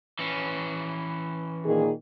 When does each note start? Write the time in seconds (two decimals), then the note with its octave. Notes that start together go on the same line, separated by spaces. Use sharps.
0.19 E3 C#4
1.65 A#2 D#3 G#4